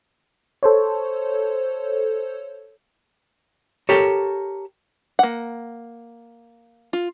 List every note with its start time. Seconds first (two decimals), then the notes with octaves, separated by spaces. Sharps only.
0.63 A4 C5 C#5
3.89 G4 A4 A#4 C#5
5.19 A#3 F#5
6.93 F4